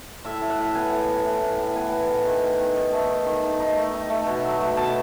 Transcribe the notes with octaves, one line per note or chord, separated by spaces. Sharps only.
A2 E5
A2
F#5
A2
B3 G#5
A2
B3
A2
A2
A2
B3 G#5
B3
A2
D#3
D#4
D#3
D#3
A3
D#3
D#3
D#4
D#4
A3
D#4
A3
B2
F#3
A3
B2 A5